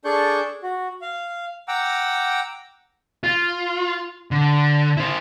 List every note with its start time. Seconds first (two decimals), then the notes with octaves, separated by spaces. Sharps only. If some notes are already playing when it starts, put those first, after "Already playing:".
0.05 D4 G#4 A4 D5 C#6 G6
0.63 F#4
1.02 F5
1.68 F#5 G5 A#5 D6 E6
3.24 F4
4.31 D3
4.97 E4 C5